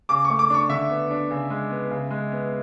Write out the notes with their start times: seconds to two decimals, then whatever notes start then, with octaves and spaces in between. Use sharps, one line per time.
0.09 C#3 D6
0.25 C#6
0.30 A3
0.39 D6
0.50 D4 C#6
0.69 D3 E5
0.89 B3
1.11 D4
1.31 C#3
1.50 G#3
1.70 B3
1.90 C#3
2.10 G#3
2.31 B3